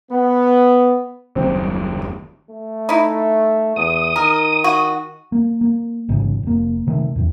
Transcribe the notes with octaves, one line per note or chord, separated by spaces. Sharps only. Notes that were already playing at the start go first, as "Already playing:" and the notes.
B3
F#1 D#2 C#3 F#3 G3 C4
A3
D#4 E4
E2 D#6
D#3 A#4
F#4
A#3
A#3
A1 G#2 C#3
F1 A#3
C3 D#3 A3
E2 A2